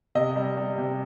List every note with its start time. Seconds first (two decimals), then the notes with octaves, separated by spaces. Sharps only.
0.15 C3 D#5
0.36 G3
0.57 G3
0.78 C3